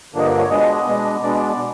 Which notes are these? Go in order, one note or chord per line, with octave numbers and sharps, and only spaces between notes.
G2 D3 F3 A#3 D4 D#5
D5
C#5
B2 G#3 B3 D4 D#5
B2 G#3 B3 D4
B2 G#3 B3 D4 D5
D5
B2